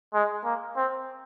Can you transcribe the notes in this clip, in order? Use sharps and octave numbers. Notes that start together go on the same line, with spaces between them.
G#3
A#3
C4